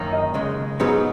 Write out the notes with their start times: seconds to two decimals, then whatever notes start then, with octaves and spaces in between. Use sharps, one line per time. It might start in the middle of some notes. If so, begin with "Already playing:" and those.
Already playing: F#2 D#3 A#3 D#4
0.12 D#5
0.34 C#2 C#3 G#3
0.80 G#2 F#3 B3 D#4 G#4